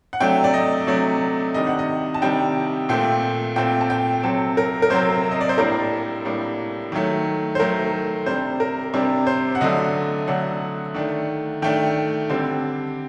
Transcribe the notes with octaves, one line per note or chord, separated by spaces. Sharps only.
F#5
C3 F#3 A3 D4 G5
D5
D#5
C3 F#3 A3 D4 D5
C3 D#3 G3 D4 D#5
F#5
D#5
A5
C3 D#3 G3 D4 G5
A#2 A3 C4 G5
A#2 A3 C4 G5
A5
G5
C3 F#3 C4 A4
A#4
A#4
C3 F#3 C4 C5
D#5
D5
C5
A2 G3 A#3 D4 A#4
A2 G3 A#3 D4
D#3 F#3 A3
C5
D#3 F#3 A3 A#4
C3 G3 D4 C5
A#4
C3 G3 D4
C5
F#5
D3 F#3 A3 D4 D#5
D3 F#3 A3 D4 F#5
D#3 A3 D4
D#3 A3 D4 G5
D3 G3 C4